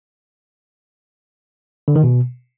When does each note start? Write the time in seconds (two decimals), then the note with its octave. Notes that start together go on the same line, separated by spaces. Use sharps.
1.88 D3
1.96 D#3
2.03 B2